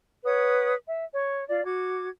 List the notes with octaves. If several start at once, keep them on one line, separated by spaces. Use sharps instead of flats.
B4 C#5 F#5 D#6
E5
C#5
F4 D5
F#4 D6 G#6